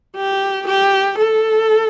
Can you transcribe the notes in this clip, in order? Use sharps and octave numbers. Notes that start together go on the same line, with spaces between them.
G4
G4
A4